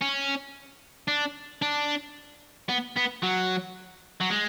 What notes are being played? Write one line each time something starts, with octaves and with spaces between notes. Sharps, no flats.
C#4
D4
D4
B3
B3
F#3
F#3
G#3